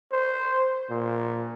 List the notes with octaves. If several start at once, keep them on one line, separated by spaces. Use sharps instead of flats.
C5
A#2